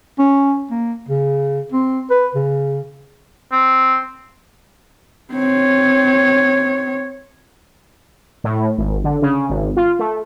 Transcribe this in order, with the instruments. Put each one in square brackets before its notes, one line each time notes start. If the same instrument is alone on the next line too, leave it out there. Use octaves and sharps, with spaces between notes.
[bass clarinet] C#4
A#3
C#3
C4
B4
C#3
[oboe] C4
[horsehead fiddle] C4 C#5
[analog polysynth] A2
G#1
D3
C#3
G#1
F4
A3